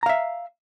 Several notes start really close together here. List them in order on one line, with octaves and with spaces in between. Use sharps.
A#5 F5 E5